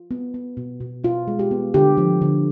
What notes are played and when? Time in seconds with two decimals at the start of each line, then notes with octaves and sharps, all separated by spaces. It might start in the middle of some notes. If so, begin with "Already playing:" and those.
Already playing: F4
0.11 B3
0.34 B3
0.57 B2
0.80 B2
1.04 B2 F4
1.28 G#3
1.39 G4
1.51 B3
1.74 D3 G4
1.97 F3
2.22 D3